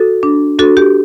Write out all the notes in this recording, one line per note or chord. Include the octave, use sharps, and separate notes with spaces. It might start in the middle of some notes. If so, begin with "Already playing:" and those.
Already playing: F#4 A4
D4
D4 F#4 A4
G4